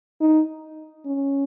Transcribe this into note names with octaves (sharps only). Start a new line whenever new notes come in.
D#4
C#4